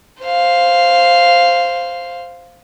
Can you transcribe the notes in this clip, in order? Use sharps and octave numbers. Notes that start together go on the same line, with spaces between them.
C5 F5